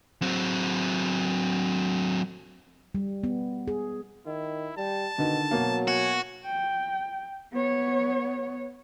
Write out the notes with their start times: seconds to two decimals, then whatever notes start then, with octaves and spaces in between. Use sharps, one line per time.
0.22 F#3 C4
2.95 G3
3.24 B3
3.68 G#4
4.26 D#3 E4
4.77 G3 A5
5.18 B2 D3 D#3
5.51 B2 F#3 A#3
5.88 F#4 G#5
6.45 G5
7.52 B3 C#5